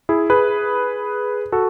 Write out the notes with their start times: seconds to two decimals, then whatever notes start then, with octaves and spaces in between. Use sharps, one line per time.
0.09 E4 G#4
0.30 G#4 B4
1.52 F#4 A4